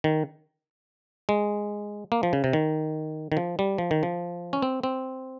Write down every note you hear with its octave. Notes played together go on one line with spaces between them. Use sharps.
D#3
G#3
A#3
F3
C#3
C3
D#3
D#3
F3
G3
F3
D#3
F3
C#4
C4
C4